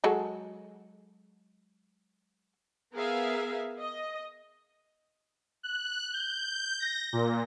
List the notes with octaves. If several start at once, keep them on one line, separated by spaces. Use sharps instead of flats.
F#3 G#3 A4
B3 G#4 A#4 E5 F5
D#5
F#6
G6
A#6
A#2